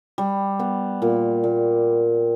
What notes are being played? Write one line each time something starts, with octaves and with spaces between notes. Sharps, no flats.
G3
B3
A#2
A#2